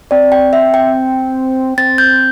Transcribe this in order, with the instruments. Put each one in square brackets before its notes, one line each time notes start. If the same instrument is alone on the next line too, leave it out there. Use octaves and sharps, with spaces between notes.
[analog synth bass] C4 [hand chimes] D5
[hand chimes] G5
E5
G5
[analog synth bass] C4 [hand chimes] A6
[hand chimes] G6